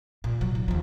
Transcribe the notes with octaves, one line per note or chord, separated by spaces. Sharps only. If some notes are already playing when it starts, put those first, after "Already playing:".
A#2
C2 F#3
D#4
D#2 F3